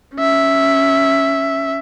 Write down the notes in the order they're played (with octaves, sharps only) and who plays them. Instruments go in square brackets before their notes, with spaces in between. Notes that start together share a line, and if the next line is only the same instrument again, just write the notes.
[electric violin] C#4 E5